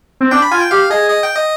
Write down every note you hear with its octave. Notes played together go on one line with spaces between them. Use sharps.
C4
D4 G5
B5
F4 G#5
G5
G4 F5
G#4 D#5
D#5
G5
D#5